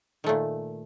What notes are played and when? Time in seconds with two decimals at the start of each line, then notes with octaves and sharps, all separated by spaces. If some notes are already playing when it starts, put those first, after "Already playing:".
0.24 D#3
0.26 A3
0.29 A#2